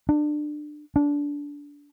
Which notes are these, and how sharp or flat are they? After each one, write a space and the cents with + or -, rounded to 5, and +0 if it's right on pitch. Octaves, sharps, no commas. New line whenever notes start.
D4 +25
D4 -20